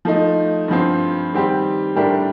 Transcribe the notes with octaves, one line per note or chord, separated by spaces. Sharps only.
F3 A3 D#4
G2 F3 C4
D#3 G3 C4 G4
A2 G3 D4 G4 A#4